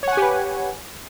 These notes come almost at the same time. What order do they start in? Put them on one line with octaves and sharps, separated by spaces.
C#5 F#5 G#5 G4 B4